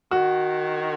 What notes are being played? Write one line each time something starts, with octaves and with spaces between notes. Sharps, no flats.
D#3 F#4